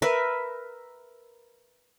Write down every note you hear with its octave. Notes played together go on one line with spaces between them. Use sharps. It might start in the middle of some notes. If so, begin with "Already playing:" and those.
A#4 B4 E5